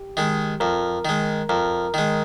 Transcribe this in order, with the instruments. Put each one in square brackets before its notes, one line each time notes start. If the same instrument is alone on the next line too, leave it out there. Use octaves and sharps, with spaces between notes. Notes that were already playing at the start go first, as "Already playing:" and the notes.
Already playing: [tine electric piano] G4
[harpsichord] D#3 G#3
[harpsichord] F2 [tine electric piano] A#4
[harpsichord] D#3 G#3
[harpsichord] F2 [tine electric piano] A#4
[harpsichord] D#3 G#3